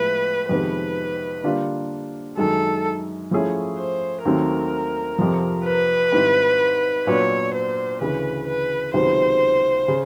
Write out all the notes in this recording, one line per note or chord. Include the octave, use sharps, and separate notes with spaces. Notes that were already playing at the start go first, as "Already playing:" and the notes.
Already playing: A2 F3 G#3 B3 B4
F2 C3 D#3 G#3 B3 B4
D3 G3 A#3 D4 F4
F#2 D#3 G#3 A4
F3 A3 C#4 E4 G#4
C5
D#2 D#3 F#3 A3 C4 A#4
F2 C3 F3
B4
G#2 D#3 G3 C4 E4
A#2 F#3 B3 D4 C#5
C5
D2 C#3 E3 B4
B4
C#2 C3 D#3 F#3 B3 C5
C#3